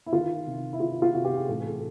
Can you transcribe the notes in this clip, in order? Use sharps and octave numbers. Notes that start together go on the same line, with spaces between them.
E4
D#3 F4
C3
E4
D#3 F4
F4
C3 F#4
G4
G#4
A1 A4
G#4
A4